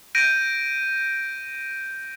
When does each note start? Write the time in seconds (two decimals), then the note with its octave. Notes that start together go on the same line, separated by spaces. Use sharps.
0.15 G6 A#6 D7 D#7